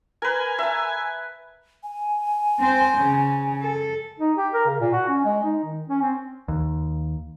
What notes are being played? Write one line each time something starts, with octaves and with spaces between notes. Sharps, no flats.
A#4 B4 G#5
E5 A5
G#5
C4 C5
C#3
A4
D#4
G4
A#4
C#3
A#2
F#4
C#4
G#3
D#4
D#3
C#4
C4
D#2